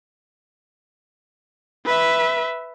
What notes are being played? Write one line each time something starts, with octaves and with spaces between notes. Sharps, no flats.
B4 E5